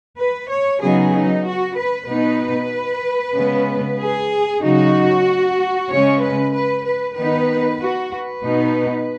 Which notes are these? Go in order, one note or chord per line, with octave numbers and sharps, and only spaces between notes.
B4
C#5
C#3 F#3 B3 D#4 G#4
D#4
F#4
B4
B2 B3 D#4 B4
C#3 G#3 B3
G#4
C#3 F#3 D#4 F#4
C#3 G#3 C#4 C#5
B4
B4
B4
D#3 B3 D#4 B4
F#4
B4
B2 B3 D#4